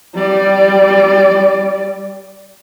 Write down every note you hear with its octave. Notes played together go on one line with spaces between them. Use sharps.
G3 D5